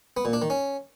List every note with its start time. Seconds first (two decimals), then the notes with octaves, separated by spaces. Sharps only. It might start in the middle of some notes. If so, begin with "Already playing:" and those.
0.17 B3
0.25 A#2
0.33 D4
0.42 D#3
0.50 C#4